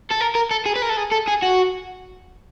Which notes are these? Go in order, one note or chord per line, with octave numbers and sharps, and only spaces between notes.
A4
A#4
A#4
A4
G#4
B4
A#4
A4
G#4
A4
G#4
F#4